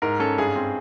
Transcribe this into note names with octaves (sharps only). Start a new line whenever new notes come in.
G#2 A#4
C#4 A4
G2 G#4
C4